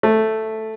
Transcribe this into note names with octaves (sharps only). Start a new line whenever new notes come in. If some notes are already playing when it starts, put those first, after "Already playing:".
A3